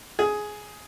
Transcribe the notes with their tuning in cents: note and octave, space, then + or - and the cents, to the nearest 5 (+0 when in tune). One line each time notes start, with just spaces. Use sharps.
G#4 +10